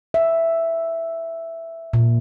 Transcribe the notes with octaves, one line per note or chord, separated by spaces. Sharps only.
E5
A#2